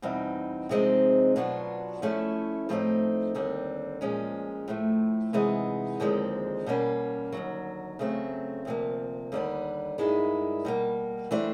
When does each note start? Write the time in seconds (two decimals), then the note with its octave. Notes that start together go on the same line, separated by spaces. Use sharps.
0.02 E2 B2 G3 C4 D#4
0.69 C3 F3 G#3 C4 D#4
1.36 B2 F#3 B3 D4 F4
2.02 F3 A3 C#4 E4 A4
2.69 A2 F3 A3 C4 D#4
3.35 D#2 D3 G3 C4
4.01 A#2 F3 G#3 C#4
4.68 A2 F3 A3
5.33 C3 E3 G#3 B3 D#4
6.00 D#2 D3 F3 G#3 C4
6.66 B2 G3 A#3 C#4
7.32 D#2 D3 F#3
7.99 C#3 F#3 A3 C4
8.65 D2 C3 F3 A#3
9.32 D#2 D3 G3 B3
9.98 G2 D#3 G#3 B3 E4
10.65 B2 G3 A#3
11.31 E3 A3 D4 G4 C5